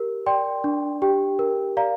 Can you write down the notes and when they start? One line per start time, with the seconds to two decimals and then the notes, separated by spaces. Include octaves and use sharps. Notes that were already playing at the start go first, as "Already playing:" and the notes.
Already playing: G4 A#4
0.26 D5 G5 C6
0.64 D4
1.02 G4 G5
1.39 A#4
1.77 D5 F5 A#5